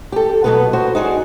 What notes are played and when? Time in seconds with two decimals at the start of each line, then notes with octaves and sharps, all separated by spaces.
0.12 G4 A4
0.44 B2 F#3 A3 B3 A4 B4
0.73 F#4 C5
0.95 D#4 F#4 G#4 D5